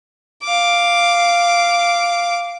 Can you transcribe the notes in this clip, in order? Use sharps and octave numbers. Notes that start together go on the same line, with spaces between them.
F5 D6